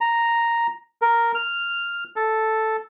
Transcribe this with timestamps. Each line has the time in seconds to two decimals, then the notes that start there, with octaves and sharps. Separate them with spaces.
0.01 A#5
1.02 A#4
1.35 F6
2.16 A4